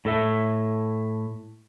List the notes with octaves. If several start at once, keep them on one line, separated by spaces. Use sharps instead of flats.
A2 A4 E5